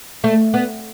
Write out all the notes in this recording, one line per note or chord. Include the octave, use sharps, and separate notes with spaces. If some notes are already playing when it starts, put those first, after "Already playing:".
A3
B3